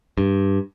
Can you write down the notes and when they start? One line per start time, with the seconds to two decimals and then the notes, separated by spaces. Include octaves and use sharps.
0.18 G2